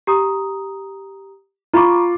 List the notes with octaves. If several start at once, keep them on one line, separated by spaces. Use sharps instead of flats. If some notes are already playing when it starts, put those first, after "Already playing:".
G4 A#5 D#6
F4 A#5 B5 C#6 D6